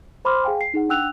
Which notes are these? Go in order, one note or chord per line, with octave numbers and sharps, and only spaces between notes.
C5 B5 C6 D6 F6
G#4 F5 G5 G#5
C7
D#4 G#4 F#5
D4 F#5 G5 E6 F#6 F7